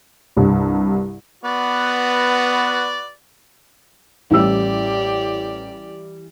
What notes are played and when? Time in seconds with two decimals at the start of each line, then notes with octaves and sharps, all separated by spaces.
0.37 C2 G2
1.44 B3 F#4 B4 D5
4.31 A1 E3 G3 G4 D5 E6